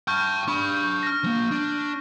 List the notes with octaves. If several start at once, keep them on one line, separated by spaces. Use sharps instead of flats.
G5 A5 C#6 F6 G6
D4 B5 C#6
F6 A#6
F3 A#3
D4